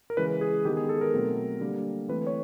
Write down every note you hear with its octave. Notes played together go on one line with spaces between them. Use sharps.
A#4
C#3 E3 G#3 B4
G#4
D#3 G#3 B3 G4
G#4
A4
A#4
B2 F#3 A3 C4
D3 G3 A#3
E3 A3 C4 B4
C#5